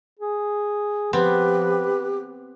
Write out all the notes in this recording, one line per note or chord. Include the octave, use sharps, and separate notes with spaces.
G#4
F3 B3 C4 G4 B4